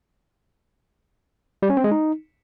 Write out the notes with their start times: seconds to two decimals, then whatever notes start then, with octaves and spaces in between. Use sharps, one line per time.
1.63 G3
1.70 C#4
1.77 C4
1.84 G#3
1.91 D#4